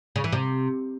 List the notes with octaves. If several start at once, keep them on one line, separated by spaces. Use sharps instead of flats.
C#3
E3
C3